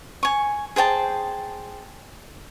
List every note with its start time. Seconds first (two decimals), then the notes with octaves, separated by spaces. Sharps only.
0.23 G#5 C#6
0.76 G#4 C5 G5 A5